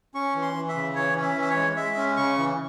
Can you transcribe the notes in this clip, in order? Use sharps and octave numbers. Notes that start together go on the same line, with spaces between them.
C#4 C#6
E3
C6
E3
E5
C#3
E3 C#5
C#4
E5
E3 E5
C#5
G#3
G#3 E5
C#4
C#3 C#6
E3